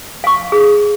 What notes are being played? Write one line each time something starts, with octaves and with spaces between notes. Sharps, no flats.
F5 C#6
G#4